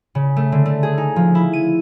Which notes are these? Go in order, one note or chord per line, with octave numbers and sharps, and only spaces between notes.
C#3
A3
D3
A3
G#4
D#4
F3
E4
D#7